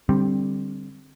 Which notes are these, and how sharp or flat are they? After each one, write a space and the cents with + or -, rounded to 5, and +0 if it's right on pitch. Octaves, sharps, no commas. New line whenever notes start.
D3 +0 G3 +0 C4 +15